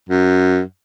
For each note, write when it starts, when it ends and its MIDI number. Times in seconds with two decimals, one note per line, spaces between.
0.09 0.60 42